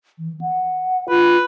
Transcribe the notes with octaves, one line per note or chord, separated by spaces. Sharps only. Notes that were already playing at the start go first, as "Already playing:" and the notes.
E3
F#5
F4 B4